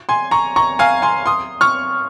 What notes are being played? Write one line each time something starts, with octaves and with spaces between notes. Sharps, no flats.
G#5 C6
A#5 C#6
A#5 C#6
F5 G#5
G#5 C6
C6 D#6
C#6 F6